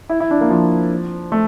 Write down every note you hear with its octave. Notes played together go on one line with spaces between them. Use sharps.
E4
E4
D4
A#3
F3
A3